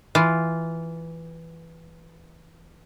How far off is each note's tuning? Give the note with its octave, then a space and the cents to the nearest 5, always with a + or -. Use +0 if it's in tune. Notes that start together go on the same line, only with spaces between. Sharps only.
E3 +0 F4 +0